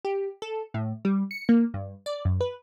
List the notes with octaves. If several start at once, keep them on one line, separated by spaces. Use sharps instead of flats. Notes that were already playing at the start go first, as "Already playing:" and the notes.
G4
A4
A2
G3
C#7
A#3
G2
D5
F#2
B4